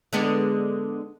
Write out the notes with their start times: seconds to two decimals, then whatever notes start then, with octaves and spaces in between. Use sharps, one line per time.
0.13 D3 G#3 B3